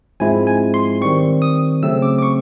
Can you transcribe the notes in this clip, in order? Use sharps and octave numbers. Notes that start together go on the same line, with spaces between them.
G#2 F3 G#3 C4 E4 G#5
G#5
C6
D#3 G3 C4 C#6
D#6
C#3 F#3 A3 C4 E6
D6
D6
C#6